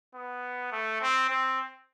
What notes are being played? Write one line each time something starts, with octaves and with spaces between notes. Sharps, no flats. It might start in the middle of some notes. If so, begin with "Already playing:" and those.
B3
A3
C4
C4